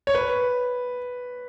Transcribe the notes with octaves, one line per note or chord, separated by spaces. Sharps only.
C#5
B4